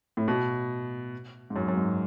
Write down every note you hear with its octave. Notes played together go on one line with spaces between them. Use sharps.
A2
B2
G#2
F#2
F#2
G#2